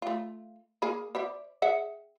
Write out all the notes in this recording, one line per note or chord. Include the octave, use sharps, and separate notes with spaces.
A3 F4
A#3 G#4 B5
C5 D5 E5
G#4 E5 F#5